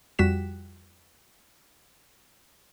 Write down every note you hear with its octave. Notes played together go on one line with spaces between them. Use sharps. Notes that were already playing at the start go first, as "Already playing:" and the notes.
F2 G3 F#4 B6 E7